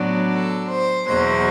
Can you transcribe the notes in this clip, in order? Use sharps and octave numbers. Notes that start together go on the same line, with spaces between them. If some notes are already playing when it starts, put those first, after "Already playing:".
Already playing: A2 F#3 B3 D4
A4
C5
E2 B2 F#3 C5